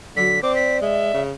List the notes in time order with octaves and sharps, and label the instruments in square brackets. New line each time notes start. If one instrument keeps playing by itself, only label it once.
[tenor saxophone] D3 [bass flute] F#3 [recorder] B6
[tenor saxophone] C4 [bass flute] D5 [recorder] D6
[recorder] B6
[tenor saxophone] G#3 [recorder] E5
[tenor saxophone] C#3